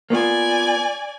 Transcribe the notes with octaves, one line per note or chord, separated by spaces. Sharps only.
A#3 B3 F4 D5 G#5